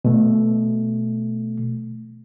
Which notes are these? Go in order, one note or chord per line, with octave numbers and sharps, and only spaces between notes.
B2 A3